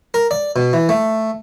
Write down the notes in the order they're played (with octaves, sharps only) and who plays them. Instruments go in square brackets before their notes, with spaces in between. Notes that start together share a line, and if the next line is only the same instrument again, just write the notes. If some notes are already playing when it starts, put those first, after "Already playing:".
[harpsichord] A#4
D5
B2
E3
A3